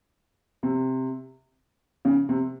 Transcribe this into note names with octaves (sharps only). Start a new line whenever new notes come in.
C3
C#3
C3